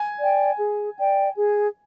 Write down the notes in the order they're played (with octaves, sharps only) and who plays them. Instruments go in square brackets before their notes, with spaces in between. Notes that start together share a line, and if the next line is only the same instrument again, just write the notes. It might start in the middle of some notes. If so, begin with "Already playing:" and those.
Already playing: [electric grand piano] G#5
[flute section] D5 G5
G#4
D5 G5
G#4